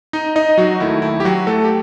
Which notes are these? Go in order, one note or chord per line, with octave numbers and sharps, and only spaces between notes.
D#4 D#5
D#4 D#5
F#3 F#4
D#2 D#3 A3 E4
E4
G4
F#3 F#4
A3 A4
G4